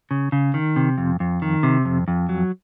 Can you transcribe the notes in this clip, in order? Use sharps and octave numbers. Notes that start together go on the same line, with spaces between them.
C#3
C#3
D#3
C3
F2
F2
D#3
C3
F2
F2
F#3